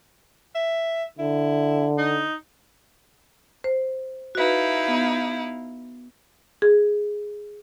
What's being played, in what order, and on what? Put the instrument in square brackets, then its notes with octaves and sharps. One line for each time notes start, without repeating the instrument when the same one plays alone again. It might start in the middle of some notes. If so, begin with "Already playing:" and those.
[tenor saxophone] E5
[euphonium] D3 [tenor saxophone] E4
[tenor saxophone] D#4
[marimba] C5
[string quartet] D#4 E4 F5 [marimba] F#4 B4
[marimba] B3
G#4